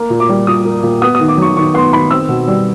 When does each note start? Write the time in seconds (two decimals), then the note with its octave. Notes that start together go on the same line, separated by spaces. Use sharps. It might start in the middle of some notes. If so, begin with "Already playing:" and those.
Already playing: A#3
0.10 A#2
0.20 D6
0.29 G3
0.47 A#2 D#6
0.65 A#3
0.83 A#2
1.02 B3 D#6
1.15 D#6
1.19 D#3
1.28 D6
1.37 F#3 C#6
1.56 D#3 C#6
1.74 B3 C6
1.93 D#3 B5
2.11 C4 E6
2.29 B2
2.48 G3